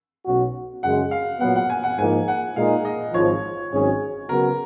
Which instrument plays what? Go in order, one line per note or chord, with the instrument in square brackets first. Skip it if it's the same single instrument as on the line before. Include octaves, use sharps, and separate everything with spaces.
[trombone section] B1 B2 F#3 C#4 F#4
[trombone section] F#2 C#3 G#3 [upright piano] F#5
[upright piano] F5
[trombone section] A#2 F#3 B3 [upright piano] F#5
[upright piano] F#5
G#5
F#5
[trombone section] G#2 F3 A#3 D#4 [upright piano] G#5
[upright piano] F#5
[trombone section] A#2 G#3 D#4 A#4 [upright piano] F5
[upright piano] D#5
[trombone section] G#1 G#2 F3 [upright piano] C#5
[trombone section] G#1 G#2 F#3 C#4 G#4
[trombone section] C#3 F#3 B3 F#4 [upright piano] A#4